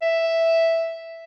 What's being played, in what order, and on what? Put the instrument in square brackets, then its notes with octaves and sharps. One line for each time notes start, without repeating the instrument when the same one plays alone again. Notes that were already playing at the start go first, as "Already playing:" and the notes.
[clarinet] E5